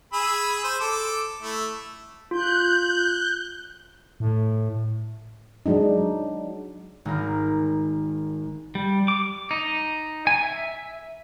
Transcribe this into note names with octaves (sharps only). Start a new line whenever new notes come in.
G#4 B5 E6
C5
A4 D6
A3 E4
F4 F#6 G6
A2
F#3 G#3 D4 D#4
G#1 A#4
G3
D6
D#4
G#5
E5